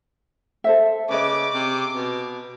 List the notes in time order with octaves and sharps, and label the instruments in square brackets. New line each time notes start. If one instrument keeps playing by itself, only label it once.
[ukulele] A4 C5 E5
[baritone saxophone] C#3 [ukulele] B4 D#5 [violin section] D6
[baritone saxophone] C3
B2